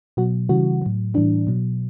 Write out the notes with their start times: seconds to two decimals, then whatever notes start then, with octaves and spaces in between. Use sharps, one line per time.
0.17 B2 F#3 F#4
0.49 C#3 E3 G3 F#4
0.82 A2 F#3
1.14 A2 E3 G3 D4
1.47 B2 F#3